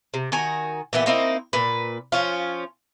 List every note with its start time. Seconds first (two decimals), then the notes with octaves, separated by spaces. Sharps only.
0.14 C3
0.32 D#3 F#4 G#5 A#5
0.93 A#2 E3 B3 G4
1.06 A#3 C4 D#4 E4
1.53 A#2 B4
2.12 F3 C#4 F4